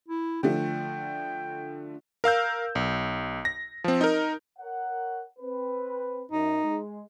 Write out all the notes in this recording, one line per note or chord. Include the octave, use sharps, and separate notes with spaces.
E4
D3 F3 A3 G5
A#4 F5 E6 G6
B1
A#6
F3 C4
D#4 A#4
A#4 C#5 F#5
C4 B4
F#2 D#4
G#3